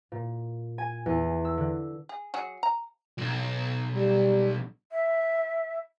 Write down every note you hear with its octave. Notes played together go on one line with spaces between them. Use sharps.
A#2
G#5
E2
E6
D3
G#4
F#3 F#4 G#4
A#5
B1
G3
E5